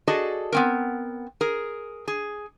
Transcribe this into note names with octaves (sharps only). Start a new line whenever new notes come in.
F#4 G#4 A4 D5 D#5
B3 C4 A#4
G#4 A#4
G#4